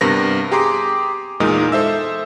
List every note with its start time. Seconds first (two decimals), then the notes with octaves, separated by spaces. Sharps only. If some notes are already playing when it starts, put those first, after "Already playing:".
0.01 G2 C3 B3 A#4 A#6
0.52 G4 G#4 A#5 C6 D6
1.40 E2 A#2 G#3 D#4 A#4 D#6
1.72 A4 C5 E5 E6